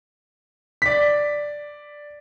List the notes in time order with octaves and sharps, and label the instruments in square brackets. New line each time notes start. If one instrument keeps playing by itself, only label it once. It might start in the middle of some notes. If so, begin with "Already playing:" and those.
[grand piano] D5 B6